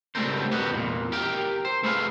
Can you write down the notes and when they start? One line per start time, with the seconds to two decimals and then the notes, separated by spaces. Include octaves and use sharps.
0.15 C#2 G3 A3 C4 A#4 C5
0.52 E2 B2 B3 F#4 G4
0.72 E2 A#2
1.12 G4 A#4 G5
1.65 C5
1.83 A3 G#4 B4 F5